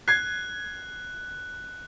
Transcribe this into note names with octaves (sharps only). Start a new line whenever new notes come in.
F#6 G#6 C7